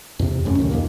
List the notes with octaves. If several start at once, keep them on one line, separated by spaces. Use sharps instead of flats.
E2 C3
F#1 F#2 A2 C#4
D2 C3 D#3
D1 F2 D#3 A#3